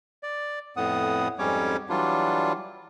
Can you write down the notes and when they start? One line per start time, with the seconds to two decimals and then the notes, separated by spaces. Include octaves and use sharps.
0.23 D5
0.77 F2 A2 B3 F#5 D#6
1.39 F2 G#2 G3 C#4 C#5 D6
1.89 E3 F#3 G3 D4 F4